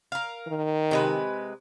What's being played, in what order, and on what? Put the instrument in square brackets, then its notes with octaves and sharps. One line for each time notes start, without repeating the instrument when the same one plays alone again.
[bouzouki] A#4 F5
[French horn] D#3
[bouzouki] C3 G#3 B4